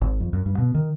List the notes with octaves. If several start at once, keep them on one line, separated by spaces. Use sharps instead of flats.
G#1
F2
F#2
G2
B2
D#3